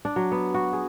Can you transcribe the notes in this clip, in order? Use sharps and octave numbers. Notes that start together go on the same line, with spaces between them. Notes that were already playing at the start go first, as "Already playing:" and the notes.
D4
F#3
B3
F#4
G#4